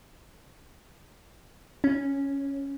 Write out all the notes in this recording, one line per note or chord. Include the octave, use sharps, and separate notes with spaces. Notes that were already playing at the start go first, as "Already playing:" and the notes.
C#4